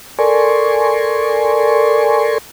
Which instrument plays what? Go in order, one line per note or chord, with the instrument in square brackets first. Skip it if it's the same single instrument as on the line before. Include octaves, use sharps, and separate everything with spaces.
[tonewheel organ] A4 A#4 D5 G#5 C6 C#6